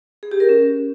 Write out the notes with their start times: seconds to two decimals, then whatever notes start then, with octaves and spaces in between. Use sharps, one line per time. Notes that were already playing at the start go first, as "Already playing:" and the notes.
0.23 G#4
0.32 G4
0.40 A#4
0.49 C#4